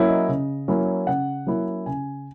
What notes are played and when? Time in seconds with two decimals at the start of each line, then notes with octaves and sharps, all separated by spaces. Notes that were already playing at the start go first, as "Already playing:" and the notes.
Already playing: F#3 A#3 C#4 E4
0.09 D#5
0.28 C#3
0.68 F#3 A#3 C#4 E4
1.07 C#3 F#5
1.47 F#3 A#3 C#4 E4
1.86 C#3 G#5